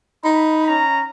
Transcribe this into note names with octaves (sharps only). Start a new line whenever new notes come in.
D#4 B5
C#4 A#5